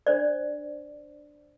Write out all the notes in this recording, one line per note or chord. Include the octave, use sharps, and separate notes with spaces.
D4 C5 D5